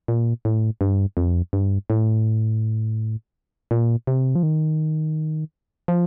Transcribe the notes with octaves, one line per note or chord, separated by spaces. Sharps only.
A#2
A2
G2
F2
G2
A2
A#2
C3
F3
D#3
F3